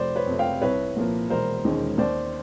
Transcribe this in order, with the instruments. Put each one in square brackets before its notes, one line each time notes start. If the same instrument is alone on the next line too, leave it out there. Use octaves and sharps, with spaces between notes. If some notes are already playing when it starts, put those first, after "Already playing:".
Already playing: [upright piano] F1 C5 D5
B4 C#5
F2 C3
F5 G5
C2 B4 C#5
A#2 F3 A#3
E1 A#4 C5
D#2 D#3 G#3 C#4
D#2 C5 D5